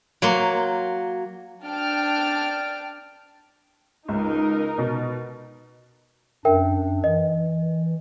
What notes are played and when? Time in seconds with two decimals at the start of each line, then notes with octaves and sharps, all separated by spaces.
0.22 F#3 A#3 C6
1.63 D4 G5 A5 F6 D7
4.08 C#2 D#4 A#4
4.78 B2
6.45 F#2 D4 A#4 E5 G5
7.04 E3 D#5